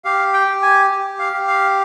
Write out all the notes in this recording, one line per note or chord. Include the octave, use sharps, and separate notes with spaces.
G4 F5
G5
G4
G#5
G4
F5
G4
F5